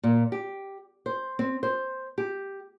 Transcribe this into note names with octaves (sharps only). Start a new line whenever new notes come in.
A#2
G4
C5
C4
C5
G4